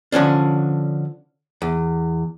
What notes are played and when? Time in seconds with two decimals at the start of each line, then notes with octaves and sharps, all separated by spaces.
0.12 D3 F3 C#4 D4
1.62 E2